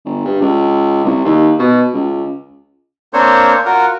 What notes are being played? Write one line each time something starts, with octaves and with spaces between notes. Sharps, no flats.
G1
G2
C#2
C2
D#2
B2
C#2
A#3 C4 D4 C5 C#5
F4 F#4 A#4